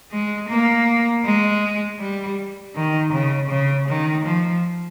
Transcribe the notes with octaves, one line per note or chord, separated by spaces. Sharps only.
G#3
A#3
G#3
G3
D#3
C#3
C#3
D#3
F3